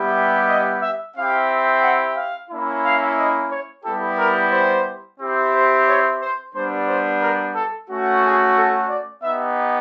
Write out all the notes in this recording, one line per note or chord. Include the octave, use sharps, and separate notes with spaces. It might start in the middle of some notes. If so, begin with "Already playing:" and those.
Already playing: G3 B3 E4 G4
D#5
E5
C4 E4 G4 F5
F#5
F5
A#3 C#4 E4
F5
D#5
C#5
G3 B3 E4 G4 A4
A#4
C5
C4 E4 G4
C5
C#5
C5
G3 B3 D4 C5
C5
A#4
A4
A3 C#4 F#4
G#4
A4
D5
B3 D#4 G4 E5